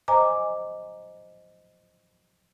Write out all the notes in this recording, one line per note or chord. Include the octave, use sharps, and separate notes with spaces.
C5 D#5 G#5 A#5 D6